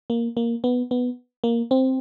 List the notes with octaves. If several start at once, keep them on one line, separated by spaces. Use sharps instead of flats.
A#3
A#3
B3
B3
A#3
C4